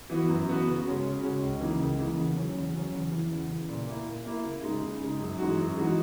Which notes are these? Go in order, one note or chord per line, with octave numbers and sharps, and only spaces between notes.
E3 B3 F#4
F#2
E3 B3 F#4
C#3
G#3 C#4 F#4
C#3
G#3 C#4 F#4
C#2
C#3 E3 A#3 D#4
C#2
C#3 E3 A#3 D#4
E2
C#3 F#3 C#4
E2
C#3 F#3 C#4
E2
C#3 E3
E2
C#3 E3
A#2
A#3 E4
A#2
A#3 E4
C#3
G#3 D#4
C#3
G#3 D#4
F#2
E3 G#3 D#4 F#4
F#2
E3 G#3 D#4 F#4